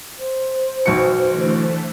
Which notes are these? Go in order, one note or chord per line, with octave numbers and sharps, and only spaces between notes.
C5
B1 B2 C#7
D3 E3 A3